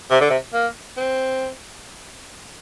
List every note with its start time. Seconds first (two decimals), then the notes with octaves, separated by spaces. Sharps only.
0.11 C3
0.21 D3
0.30 C3
0.54 A#3
0.97 C4